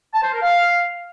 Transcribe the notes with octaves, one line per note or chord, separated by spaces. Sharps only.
A5
C5
A#4
F5